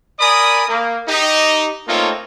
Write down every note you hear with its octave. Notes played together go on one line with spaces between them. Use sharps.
A#4 D5 G#5 B5 D#6
A#3
D#4 G4
A3 A#3 C4 D#4 F4 C#5